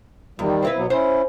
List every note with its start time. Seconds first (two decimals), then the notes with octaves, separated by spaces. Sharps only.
0.39 E2 D#3 G3
0.62 C4 E4 B4
0.76 B2 F#3 B3
0.90 C#4 E4 C5